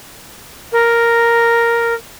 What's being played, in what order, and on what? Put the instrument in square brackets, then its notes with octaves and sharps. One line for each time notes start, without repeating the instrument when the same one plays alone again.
[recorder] A#4